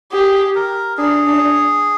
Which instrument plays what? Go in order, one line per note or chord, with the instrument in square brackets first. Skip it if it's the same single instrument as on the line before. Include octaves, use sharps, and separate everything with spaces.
[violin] G4 [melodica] G#4
[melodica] A#4
[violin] D4 [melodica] G#4
[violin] D4